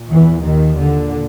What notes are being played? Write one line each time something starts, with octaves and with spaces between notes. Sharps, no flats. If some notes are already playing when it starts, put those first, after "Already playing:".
Already playing: A#2
E2 E3
D#2 D#3
A#2 D3